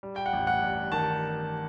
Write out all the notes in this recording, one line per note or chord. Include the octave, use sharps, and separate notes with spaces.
G3
G5
F#5
A1
F#5
G2
D#3 A5